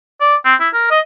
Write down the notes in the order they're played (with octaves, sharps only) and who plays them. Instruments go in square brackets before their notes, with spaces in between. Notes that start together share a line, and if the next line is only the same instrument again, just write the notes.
[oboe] D5
C4
E4
A#4
D#5